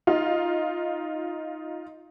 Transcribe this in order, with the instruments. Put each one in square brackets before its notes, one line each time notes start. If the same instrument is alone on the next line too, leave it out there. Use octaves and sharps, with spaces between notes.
[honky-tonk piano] D#4 F4